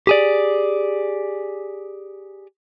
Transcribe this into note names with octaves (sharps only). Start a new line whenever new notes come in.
G4 G#4 D5